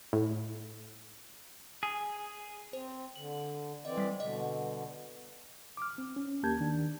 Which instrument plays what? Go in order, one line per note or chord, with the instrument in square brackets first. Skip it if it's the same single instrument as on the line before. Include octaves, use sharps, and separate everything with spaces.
[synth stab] A2
[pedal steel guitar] G#4
[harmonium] C4 [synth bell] C5
[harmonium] D3 [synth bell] F#7
[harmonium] E3 C4 D5 [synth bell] D#5
[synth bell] G3 B6
[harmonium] B2 D3 [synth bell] D#5
[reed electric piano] D6 F6
C4
C#4
D#2 A#3 G4 A5 G6 G#6
D#3 D4